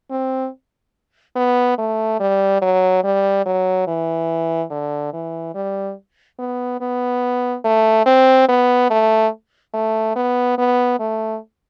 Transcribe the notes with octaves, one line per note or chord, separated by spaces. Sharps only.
C4
B3
A3
G3
F#3
G3
F#3
E3
D3
E3
G3
B3
B3
A3
C4
B3
A3
A3
B3
B3
A3